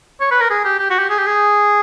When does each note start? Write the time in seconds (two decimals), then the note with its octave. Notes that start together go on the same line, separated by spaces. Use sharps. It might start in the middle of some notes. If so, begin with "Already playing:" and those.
0.20 C#5
0.31 B4
0.40 A#4
0.50 G#4
0.65 G4
0.79 G4
0.90 F#4
0.99 G4
1.10 G#4
1.18 G4
1.26 G#4